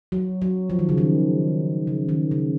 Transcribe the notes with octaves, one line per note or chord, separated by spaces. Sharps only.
F#3
F#3
F3
D#3
C#3
D#3
C#3
D#3
C#3